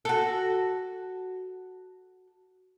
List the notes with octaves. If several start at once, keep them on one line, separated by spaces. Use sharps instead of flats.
F#4 A4